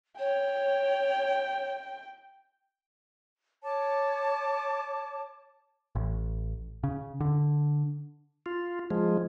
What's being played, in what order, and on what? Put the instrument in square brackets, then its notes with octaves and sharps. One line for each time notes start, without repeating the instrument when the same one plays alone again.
[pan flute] C#5 [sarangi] G5
[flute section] C#5 A5 D6
[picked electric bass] A1
C#3
D3
[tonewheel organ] F4
F3 G#3